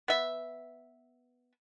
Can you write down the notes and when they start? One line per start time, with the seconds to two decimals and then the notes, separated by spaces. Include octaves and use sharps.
0.08 B3 E5